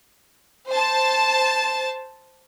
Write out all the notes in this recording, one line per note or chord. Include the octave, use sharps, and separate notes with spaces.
C5 A5